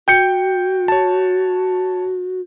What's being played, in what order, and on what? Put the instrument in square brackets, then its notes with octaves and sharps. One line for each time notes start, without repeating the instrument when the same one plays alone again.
[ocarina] F#4 [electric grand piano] G5 G6 C#7
[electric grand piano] C#5 A5